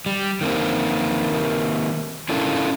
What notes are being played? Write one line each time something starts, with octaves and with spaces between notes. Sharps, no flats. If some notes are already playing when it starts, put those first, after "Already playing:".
G3
D#3 A#3 C4
C#4 D4 E4 F4 A4 A#4